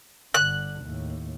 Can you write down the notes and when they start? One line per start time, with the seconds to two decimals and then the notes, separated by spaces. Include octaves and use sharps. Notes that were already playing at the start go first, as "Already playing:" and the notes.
0.34 G1 D3 F#6
0.81 D#2 A2